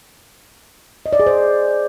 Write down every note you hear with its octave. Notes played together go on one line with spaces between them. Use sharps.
D#5
D5
G#4
C5